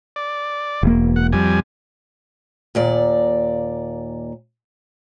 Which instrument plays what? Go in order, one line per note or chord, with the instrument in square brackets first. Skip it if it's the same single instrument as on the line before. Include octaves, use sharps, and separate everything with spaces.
[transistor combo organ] D5
[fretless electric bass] E1 A#3
[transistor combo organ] F#5
F2 G3 G#5
[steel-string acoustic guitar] D#2 A#2 D5